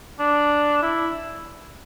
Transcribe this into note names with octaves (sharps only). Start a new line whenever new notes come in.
D4
E4